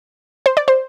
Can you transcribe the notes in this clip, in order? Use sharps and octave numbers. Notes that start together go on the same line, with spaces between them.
C5
D5
C5